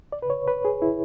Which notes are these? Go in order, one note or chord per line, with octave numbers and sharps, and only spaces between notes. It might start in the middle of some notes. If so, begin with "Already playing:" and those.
D5
B4
C#5
B4
G#4
E4